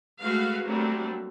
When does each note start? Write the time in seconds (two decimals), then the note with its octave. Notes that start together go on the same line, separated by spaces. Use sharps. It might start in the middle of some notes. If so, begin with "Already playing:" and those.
0.22 G#3 A3 F#4 B4 F5
0.66 F#3 G3 A3 A#3 C4 D4